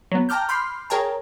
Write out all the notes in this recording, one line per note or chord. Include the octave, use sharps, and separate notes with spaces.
F#3 B3
G5 A5 A#5 D6 F6 G6
B5 C6 D6 F6 G6 C7
G#4 A#4 C#5 G5 A5 A#5